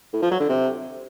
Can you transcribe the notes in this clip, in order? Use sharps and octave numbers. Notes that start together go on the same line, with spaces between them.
A2
F3
F#3
D3
C3